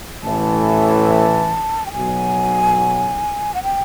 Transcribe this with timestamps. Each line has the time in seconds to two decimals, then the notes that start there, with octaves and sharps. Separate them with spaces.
0.23 A1 A2 E3 A5
1.86 G5
1.93 B1 B2 F#3 G#5
3.54 F#5
3.63 G5